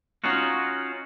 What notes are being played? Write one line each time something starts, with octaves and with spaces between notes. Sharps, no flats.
C#4 D#4 F4 F#4